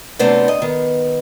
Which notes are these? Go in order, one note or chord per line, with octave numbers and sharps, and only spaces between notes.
F#2 C3 A3 B3 C4 D4
D#5
D#3 B3